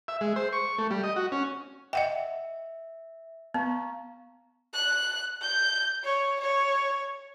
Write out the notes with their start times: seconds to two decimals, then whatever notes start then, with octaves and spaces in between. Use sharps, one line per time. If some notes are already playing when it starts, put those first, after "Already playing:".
0.08 E5
0.21 G#3
0.36 C5
0.53 C#6
0.78 A3
0.91 G3
1.04 D#5
1.16 F#4
1.32 C#4
1.93 D#5 E5 F#5 G5
3.54 B3 F5 A#5 C#6
4.74 F#6
5.42 G6
6.04 C#5
6.41 C#5